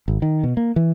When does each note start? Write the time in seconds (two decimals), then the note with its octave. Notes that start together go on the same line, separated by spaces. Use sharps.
0.08 G#1
0.22 D#3
0.43 B2
0.57 A#3
0.76 E3